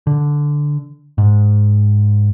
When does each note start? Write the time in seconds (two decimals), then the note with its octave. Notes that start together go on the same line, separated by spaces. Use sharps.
0.07 D3
1.18 G#2